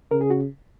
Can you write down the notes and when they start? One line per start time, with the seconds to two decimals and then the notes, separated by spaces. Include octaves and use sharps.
0.11 C#3 A#4
0.21 G#4
0.30 F#4